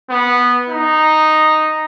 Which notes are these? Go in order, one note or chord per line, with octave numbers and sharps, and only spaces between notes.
B3
D#4